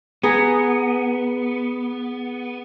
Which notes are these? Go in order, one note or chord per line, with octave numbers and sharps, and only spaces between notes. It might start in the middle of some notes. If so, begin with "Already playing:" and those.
B3 G#4 A#5